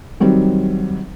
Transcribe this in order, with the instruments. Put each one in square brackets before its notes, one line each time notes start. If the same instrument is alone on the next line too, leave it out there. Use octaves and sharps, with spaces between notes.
[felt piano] D#3 F#3 G3 C4